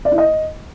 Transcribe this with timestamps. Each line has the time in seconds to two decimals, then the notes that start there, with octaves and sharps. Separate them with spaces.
0.05 D5
0.12 E4
0.18 D#5